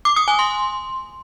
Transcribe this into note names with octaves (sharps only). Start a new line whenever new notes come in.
D6
D#6
G#5
C6